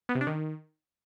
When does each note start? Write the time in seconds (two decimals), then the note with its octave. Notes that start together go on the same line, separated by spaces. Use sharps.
0.09 B3
0.15 C3
0.21 D4
0.27 D#3